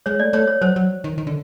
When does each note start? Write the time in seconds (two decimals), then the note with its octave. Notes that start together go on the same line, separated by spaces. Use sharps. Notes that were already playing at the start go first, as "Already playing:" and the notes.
0.06 G#3 C#5
0.20 A3 D5
0.33 A3 C#5
0.48 C#5
0.61 F#3 C5
0.76 F#3
1.04 D#3
1.18 D#3
1.27 D3